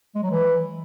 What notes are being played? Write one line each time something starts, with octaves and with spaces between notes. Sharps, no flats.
G#3
F#3
E3